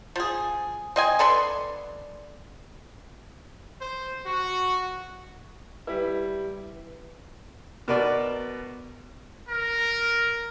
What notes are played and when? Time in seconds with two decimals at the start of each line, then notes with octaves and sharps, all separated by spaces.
0.16 F3 G#4
0.96 C4 D#5 G#5
1.19 D3 A4 B4 C6
3.81 C5
4.26 F#4
5.87 G3 E4 B4
7.88 B2 A#4 B4 D5
9.48 A#4